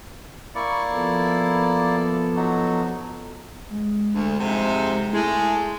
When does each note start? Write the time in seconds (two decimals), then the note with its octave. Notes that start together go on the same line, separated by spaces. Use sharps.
0.55 A#3 E4 D5 C#6
0.91 F3 B3 A4
2.36 F#3 D#4 F#4
3.70 G#3
4.14 D2
4.40 F2 G#2 C3
5.13 G#3 A3 E4